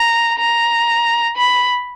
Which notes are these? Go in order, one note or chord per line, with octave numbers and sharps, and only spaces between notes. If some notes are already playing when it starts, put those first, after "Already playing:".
Already playing: A#5
A#5
B5